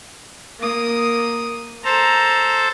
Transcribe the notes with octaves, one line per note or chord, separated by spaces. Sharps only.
A#3 D#6
A4 C5 A#5